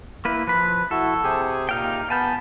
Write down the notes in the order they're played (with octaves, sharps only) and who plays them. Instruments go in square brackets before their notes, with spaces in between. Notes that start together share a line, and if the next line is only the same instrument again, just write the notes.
[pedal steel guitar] A#3 B4 [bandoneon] E4
[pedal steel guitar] F3 B5 [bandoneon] B4
[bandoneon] E4 F#4 [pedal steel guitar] A4
[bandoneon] C3 G4 G#4
[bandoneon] A#2 G4 [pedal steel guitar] D#4 F5 G5
[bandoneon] B3 B5 [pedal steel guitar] G#5 A5 G6